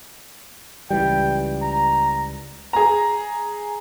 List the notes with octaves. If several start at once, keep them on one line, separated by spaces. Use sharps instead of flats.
C#2 E3 G3 G5
A#5
G#4 A#5